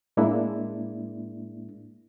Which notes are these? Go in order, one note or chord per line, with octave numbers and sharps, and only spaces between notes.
A2 G#3 A#3 D4 E4